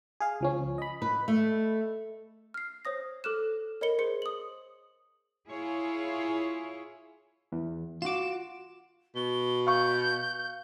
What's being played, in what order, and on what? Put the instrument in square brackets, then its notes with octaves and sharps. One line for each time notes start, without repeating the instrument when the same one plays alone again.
[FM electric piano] G#4 F5
C#2 F3 C#4
D#5 B5
[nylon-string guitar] B4
A3
[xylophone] F6 C7
C5 C#5 D#6 A#6
A4 D6 F6 F#6 E7
A#4 C#5 D#5 B5 C#7 G7
G#4 C5 C6 C#7
D#6 F#7
[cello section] E4 F4 G#4 C#5
[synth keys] E2
[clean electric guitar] F4 F#4 [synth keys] D6 E7
[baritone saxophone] B2 [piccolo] G7
[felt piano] F5 C#6 [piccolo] G6